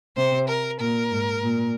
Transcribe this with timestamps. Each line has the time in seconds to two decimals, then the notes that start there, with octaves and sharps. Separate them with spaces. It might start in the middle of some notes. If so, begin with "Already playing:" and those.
0.17 C3 C5
0.48 A#4
0.80 A#2 A#4
1.11 G#2
1.43 A#2